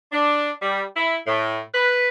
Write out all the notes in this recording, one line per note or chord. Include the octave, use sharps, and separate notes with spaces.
D4
G3
E4
A2
B4